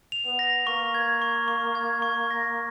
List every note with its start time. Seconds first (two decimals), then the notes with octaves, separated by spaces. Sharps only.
0.12 F7
0.26 B3
0.39 A#6
0.67 A#3 C#6
0.94 G#6
1.22 C#6
1.48 C#6
1.75 G#6
2.02 C#6
2.31 A#6